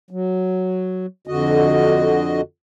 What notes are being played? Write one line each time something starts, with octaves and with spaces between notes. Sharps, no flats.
F#3
F2 D3 F#4 D#5